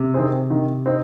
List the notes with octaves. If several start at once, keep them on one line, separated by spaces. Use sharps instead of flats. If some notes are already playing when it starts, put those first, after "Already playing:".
Already playing: C3
D#3 C4 G#4 C5
D#3
C4 D#4 C5